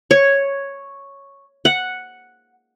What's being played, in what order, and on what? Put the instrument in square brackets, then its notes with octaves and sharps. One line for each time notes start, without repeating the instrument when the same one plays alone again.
[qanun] C#5
F#5